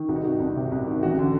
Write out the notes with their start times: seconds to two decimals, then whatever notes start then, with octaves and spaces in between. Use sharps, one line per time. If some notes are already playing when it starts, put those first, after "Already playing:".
Already playing: D#3
0.09 C2 F#4
0.16 D#4
0.23 D#3 F#4
0.40 C2
0.56 C3
0.72 C2
0.86 D#3
1.03 A1 F#4
1.19 D3